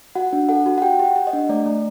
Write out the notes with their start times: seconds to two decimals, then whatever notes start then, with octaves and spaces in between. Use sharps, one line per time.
0.15 F#4 F#5
0.33 D4
0.49 A4 F#5
0.66 F#4
0.78 F#5
0.82 G4 G5
0.99 G4
1.05 F#5
1.16 G4
1.27 D#5
1.33 D4
1.49 A3 D5
1.66 A3